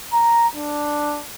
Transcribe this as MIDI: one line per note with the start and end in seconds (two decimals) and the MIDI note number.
0.13 0.47 82
0.55 1.21 62